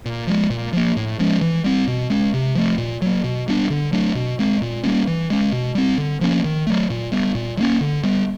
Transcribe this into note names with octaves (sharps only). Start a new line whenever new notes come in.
A#2
F3 G#3
A#2
F3 A#3
A2
F3 G#3 C#4
E3
G3 C4
B2
G#3 C#4
C3
F3 A3
A#2
F#3 A#3
B2
G3 B3 D4
D3
F#3 A3 D4
B2
G#3 C4
A#2
G3 A#3 C#4
E3
G#3 C#4
B2
G3 C4
D3
F3 A#3 C#4
D#3
F#3 A3
A#2
G3 B3
A#2
F#3
A#3 C#4
D3
G3 B3